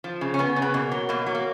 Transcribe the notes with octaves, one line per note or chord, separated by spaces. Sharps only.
F3
C#3
C#4
C#3 B3
C#3
B3
B2 A#3
F#3
B2 A#3
F#3
A#3